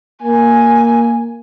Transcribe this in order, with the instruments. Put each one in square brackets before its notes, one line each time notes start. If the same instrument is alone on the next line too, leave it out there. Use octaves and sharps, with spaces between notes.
[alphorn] A#3 [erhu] G#5